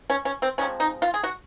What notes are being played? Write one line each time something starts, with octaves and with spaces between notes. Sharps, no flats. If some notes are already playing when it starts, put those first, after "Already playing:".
C#4
C#4
C4
C3 F3 G#3 C#4
D#4
F4
G#4
F#4